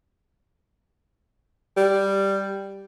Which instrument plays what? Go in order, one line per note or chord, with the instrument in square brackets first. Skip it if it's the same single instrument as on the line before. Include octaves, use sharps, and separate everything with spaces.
[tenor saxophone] G3